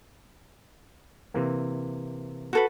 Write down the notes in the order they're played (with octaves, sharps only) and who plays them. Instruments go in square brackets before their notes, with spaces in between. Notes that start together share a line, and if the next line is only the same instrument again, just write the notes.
[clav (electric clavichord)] C3 E3 A#3
[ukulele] F#4 A4 B4